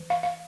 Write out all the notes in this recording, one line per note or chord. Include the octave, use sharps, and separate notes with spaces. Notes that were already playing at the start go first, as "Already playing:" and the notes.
Already playing: E3
F5
F5